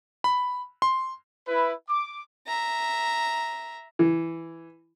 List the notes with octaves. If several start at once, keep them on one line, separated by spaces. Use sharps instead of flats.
B5
C6
E4 B4
D6
E5 A#5
E3